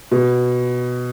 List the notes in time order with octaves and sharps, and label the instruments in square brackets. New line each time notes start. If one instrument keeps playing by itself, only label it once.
[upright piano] B2